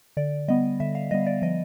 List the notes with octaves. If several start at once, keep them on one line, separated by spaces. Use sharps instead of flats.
D3 D5
G3 B3 D#5
D3 E5
F5
G3 B3 D#5
D5
F3 D#5